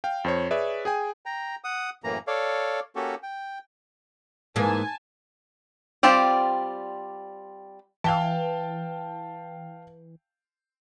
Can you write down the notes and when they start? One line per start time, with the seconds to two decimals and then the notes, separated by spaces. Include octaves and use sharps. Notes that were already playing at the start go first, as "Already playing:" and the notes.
0.04 F5 G5
0.24 F2 C5 C#5
0.51 G#4 B4 C#5 D5 E5
0.85 G#4 G5 G#5
1.26 G5 A#5
1.64 F#5 D#6
2.04 F#2 A2 E3 A#3 A#5
2.27 A4 C#5 D5 F5
2.96 A#3 C#4 F#4 G4 A4
3.23 G5
4.56 G#2 E3 A#3 G#5 A5
6.03 G3 C4 F4 G4 D5
8.04 E3 F5 G5 A5